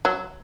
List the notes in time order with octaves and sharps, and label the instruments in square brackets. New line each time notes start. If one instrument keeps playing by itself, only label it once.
[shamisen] F#3